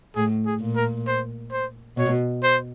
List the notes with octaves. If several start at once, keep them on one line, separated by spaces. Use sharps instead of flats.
A2 G#4
G#4
A#2
A#4
C5
C5
B2 C#5
C5